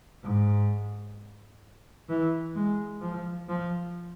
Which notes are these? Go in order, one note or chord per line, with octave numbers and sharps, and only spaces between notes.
G#2
E3
G#3
F3
F3